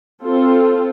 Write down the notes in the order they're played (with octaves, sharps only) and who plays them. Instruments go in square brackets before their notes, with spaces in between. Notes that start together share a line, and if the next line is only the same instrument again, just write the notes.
[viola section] C4 F4 A4